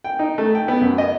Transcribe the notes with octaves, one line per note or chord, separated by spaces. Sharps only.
G5
D#4
A3
G5
B3
F#2
D#5